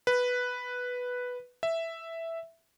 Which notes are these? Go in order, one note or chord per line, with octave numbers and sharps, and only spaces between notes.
B4
E5